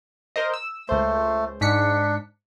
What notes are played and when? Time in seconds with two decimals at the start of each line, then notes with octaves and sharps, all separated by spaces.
0.36 A#4 C5 D#5
0.54 E6
0.89 C#2 A3 C5
1.61 G#2 D4 B6 C#7